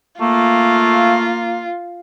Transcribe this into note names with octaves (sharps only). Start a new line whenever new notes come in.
A3 A#3 F4